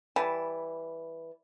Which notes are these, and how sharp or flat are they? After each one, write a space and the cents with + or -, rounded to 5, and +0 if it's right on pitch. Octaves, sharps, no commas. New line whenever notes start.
E3 -5 G3 +0 A5 -10